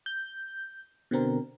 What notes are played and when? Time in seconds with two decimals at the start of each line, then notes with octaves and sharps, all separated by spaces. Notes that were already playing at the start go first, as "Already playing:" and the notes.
0.06 G6
1.11 B2 D3 C4 A#4